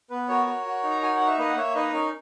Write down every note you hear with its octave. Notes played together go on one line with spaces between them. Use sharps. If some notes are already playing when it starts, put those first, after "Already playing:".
B3 B4
F#4 A#4 C#5
F#4
F#4
D#4
A#5
F#4 G#5
F#5
D#4
E5
A#3 B4 D#5
F#5
A#3 C#5 E5
D#4 B4 D#5
C#4 A#4